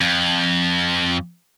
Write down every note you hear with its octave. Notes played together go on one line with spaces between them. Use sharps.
F2